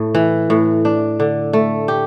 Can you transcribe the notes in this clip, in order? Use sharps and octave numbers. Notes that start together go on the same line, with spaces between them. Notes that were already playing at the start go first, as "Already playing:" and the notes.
Already playing: A2 A3
E3
A2
D4
D3
A3
G4